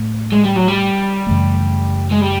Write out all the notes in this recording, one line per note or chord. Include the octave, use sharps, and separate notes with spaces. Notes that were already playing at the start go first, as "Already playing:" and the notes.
Already playing: A2 A3
G#3
G3
F#3
G3
F#2 C#3 E3 A3
G#3
G3